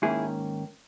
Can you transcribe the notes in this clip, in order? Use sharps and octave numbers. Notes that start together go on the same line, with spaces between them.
G#2 D#3 A#3 C#4 E4 G#4